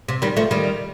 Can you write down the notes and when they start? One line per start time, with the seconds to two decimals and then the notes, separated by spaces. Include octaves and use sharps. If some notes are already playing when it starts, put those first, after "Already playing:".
0.08 C3
0.22 D#3 G3
0.37 F3 A3
0.51 D#3 G3